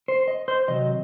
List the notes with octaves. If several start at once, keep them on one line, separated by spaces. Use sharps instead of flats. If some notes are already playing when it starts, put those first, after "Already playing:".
C5
D#5
C5
C3 D#3 F#3 D#5